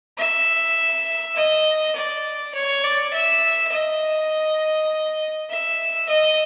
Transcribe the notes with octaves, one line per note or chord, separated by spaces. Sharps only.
E5
D#5
D5
C#5
D5
E5
D#5
E5
D#5